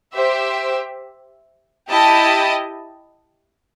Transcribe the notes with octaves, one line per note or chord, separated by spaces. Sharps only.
G4 C5 E5
E4 G4 D#5 A5